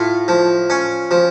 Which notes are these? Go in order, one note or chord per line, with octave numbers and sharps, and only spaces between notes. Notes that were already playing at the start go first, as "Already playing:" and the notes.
Already playing: A2 F4
F3
C#4
F3